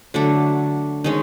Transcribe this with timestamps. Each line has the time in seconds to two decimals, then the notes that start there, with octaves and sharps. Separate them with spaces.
0.14 D3 F#3 A3 D4
1.04 D#3 G#3 C#4